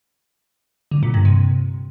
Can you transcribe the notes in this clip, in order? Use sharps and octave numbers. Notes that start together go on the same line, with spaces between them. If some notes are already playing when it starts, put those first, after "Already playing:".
D3
A#2
G2
C3